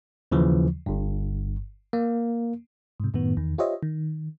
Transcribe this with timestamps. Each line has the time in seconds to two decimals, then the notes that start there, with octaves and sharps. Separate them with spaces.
0.32 D#2 C#3 E3 F3
0.86 G1 G2
1.93 A#3
3.00 G#2 C3
3.14 F#2 A2 D#3 B3
3.37 E2 D#3
3.58 F4 G4 C5 C#5 D#5 E5
3.83 D#3